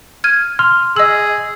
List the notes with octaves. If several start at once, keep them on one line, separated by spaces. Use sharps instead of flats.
F6 G#6 D#7
C6 F6
G#4 D#5 E6 F#7